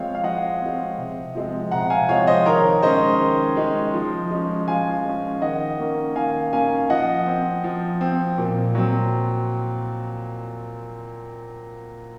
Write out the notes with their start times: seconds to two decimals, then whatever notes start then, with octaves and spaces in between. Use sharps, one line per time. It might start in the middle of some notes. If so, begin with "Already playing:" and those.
Already playing: F3 G#3 C4 C#5 F5
0.15 F5
0.24 F3 D#5 F#5
0.61 G#3 C4
0.98 C3
1.35 F3 G#3 C4
1.71 C3 F#5 A#5
1.90 F5 G#5
2.09 F3 G#3 C4 C#5 F5
2.27 C5 D#5
2.46 D#3 A#4 C#5
2.82 G#3 C#4 C5 D#5
3.20 D#3
3.57 G#3 C#4
3.94 F3
4.31 G#3 C#4
4.68 F3 F5 G#5
5.05 G#3 C#4
5.42 D#3 D#5 F#5
5.79 A#3 C#4
6.16 D#3 F5 G#5
6.53 A#3 C#4 F5 G#5
6.90 F3 D#5 F#5
7.27 C4
7.64 F3
8.01 C4
8.38 A#2
8.75 F#3 C4